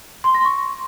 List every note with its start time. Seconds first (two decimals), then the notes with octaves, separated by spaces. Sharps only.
0.24 C6
0.35 A#6
0.45 C#6